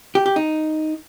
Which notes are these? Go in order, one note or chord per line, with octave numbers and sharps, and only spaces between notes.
G4
G4
D#4